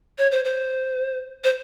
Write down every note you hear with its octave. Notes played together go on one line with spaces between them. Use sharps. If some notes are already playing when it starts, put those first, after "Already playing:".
C#5
C5
C5
C5